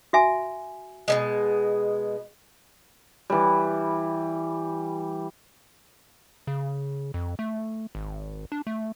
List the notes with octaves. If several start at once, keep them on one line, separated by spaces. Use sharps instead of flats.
F#4 E5 G#5
B2 D3 G#3
E3 G3
C#3
F2
A3
G#1
D4
A3